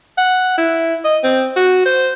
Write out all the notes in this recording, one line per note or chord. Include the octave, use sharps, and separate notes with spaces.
F#5
E4
D#5
C4
F#4
C5